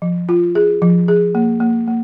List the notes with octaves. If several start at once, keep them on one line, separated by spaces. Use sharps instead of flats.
F3
F4
G#4
F3
G#4
A#3
A#3
A#3